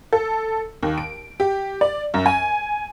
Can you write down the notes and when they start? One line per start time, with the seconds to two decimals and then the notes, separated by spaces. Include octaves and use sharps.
0.13 A4
0.83 D#2
0.98 D7
1.40 G4
1.81 D5
2.14 F#2
2.26 G#5